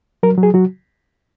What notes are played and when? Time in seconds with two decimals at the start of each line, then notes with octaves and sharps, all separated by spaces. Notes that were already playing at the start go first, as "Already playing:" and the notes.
0.23 F#3 A#4
0.38 F#3
0.43 G#4
0.54 F#3 F#4